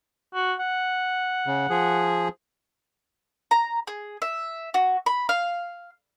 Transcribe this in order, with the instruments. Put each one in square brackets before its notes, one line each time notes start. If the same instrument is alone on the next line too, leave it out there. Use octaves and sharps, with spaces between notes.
[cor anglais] F#4
F#5
[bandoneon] C#3
F3 G#4
[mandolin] A#5
G#4
E5
F#4
B5
F5